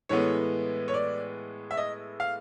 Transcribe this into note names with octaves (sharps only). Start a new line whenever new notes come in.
A2 E3 G#3 B3 C#5
C#5
D5
E5
D#5
F5